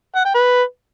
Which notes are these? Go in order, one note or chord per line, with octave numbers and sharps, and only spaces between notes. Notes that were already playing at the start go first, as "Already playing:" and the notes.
F#5
G5
B4